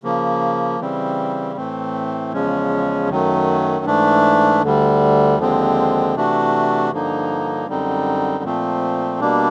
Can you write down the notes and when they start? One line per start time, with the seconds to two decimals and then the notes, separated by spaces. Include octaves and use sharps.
0.03 C#3 F3 A#3
0.80 C#3 E3 G3 C4
1.56 A2 E3 A3 C4
2.33 E2 C#3 F3 G#3 C#4
3.09 F#2 D#3 F#3 A3
3.85 G#2 E3 A3 D4
4.62 D2 D3 G3
5.38 D#2 D3 F3 G#3 C4
6.15 C3 E3 A3 D4 F#4
6.91 G2 D3 F3 A#3 D#4
7.68 F#2 D3 G3 C4 D#4
8.44 A#2 F3 A3 C4
9.20 B2 G3 A#3 D4